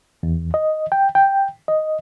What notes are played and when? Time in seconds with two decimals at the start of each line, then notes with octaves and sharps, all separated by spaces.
0.23 E2
0.54 D#5
0.92 G5
1.15 G5
1.68 D#5